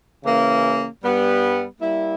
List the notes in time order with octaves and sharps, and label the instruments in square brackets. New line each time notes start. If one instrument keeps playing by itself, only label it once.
[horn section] C#3 E3 A#3 C#4
G2 G3 B3 G4
G3 A#3 E4